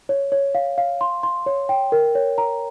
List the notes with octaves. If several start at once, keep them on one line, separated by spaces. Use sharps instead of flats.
C#5
C#5
F5
F5
C6
C6
C#5
G5
A#4
C#5
A#5